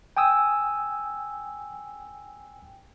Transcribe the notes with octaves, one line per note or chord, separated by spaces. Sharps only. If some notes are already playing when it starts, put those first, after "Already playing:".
G5 G#5 D#6 E6